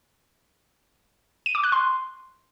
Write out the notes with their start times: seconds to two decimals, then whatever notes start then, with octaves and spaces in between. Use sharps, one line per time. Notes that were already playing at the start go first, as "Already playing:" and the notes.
1.46 D#7
1.55 D6
1.64 F#6
1.72 C6